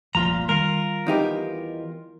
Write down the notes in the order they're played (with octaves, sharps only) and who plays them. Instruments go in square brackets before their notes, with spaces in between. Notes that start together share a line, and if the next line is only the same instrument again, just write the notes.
[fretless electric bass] F1 C2 F3 [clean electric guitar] A#2 F4 A#5
[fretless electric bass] D#3 G3 [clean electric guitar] F4 A#4
[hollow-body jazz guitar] E2 D#4 G4